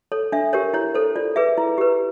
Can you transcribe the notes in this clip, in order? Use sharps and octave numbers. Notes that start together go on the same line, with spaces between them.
A4 C#5
D4 E5
G4 A#4 C#5
E4 C#5
A4 C5
F4 D5
G#4 B4 E5
E4
G4 B4